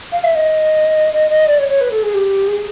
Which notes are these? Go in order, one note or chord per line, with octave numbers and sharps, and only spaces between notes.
F5
E5
D#5
D#5
D#5
D5
C#5
C#5
B4
A4
G#4
G4
G#4